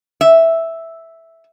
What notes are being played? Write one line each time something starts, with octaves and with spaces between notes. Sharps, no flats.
E5